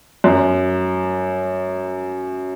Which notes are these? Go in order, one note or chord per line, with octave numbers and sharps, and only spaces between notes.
F#2